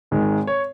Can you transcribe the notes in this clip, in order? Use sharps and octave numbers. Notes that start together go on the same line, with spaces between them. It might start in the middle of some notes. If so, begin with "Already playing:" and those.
G#1 G#2 D#3 G#3
C#5